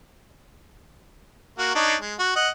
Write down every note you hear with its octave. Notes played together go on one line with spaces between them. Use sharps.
A#3 F#4
D4 D#4 C#5
G#3
F#4
D#5 F#5